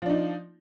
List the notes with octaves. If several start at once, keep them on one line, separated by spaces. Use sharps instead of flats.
F3 D4 D#4